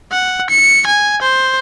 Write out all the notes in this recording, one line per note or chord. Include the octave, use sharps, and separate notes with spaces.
F#5
C#7
G#5
C5